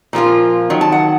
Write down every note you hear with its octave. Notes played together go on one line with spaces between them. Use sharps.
A#2 F3 A#3 F4
D#3 F#3
A5
F#5